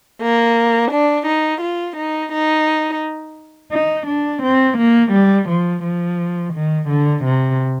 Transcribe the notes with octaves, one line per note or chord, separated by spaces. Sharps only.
A#3
D4
D#4
F4
D#4
D#4
D#4
D4
C4
A#3
G3
F3
F3
D#3
D3
C3